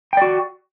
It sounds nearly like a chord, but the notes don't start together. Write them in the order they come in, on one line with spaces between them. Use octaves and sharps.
G5 D5 F#4